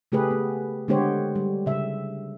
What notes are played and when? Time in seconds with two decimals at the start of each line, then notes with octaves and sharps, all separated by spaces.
0.12 C#3 A3 G4 G#4 B4
0.31 B3
0.88 D3 G#3 B3 G4 C5 C#5
1.35 G3
1.66 C#3 E5